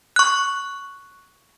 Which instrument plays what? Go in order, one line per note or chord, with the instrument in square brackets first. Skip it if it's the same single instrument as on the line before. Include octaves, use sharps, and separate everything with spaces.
[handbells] C#6 F#6